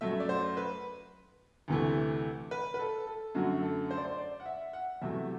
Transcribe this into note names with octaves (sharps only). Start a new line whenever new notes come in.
F#2 F#3 A3 E5
E5
D5
C5
B4
D2 C3 E3 A3
B4
B4
A4
A4
F#2 D3 F#3 A3 F#4
A4
C5
D5
C5
D5
F#5
E5
F#5
E2 C3 F#3 A3 E5